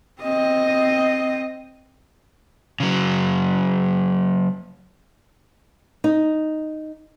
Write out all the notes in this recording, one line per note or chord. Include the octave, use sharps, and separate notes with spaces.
C4 D#5
C#3 F#3
D#4